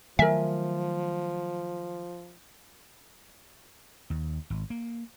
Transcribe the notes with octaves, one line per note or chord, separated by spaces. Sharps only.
D#3 F3 F#3 A3 A#4 E5 G#5
D#2
G#1
A#3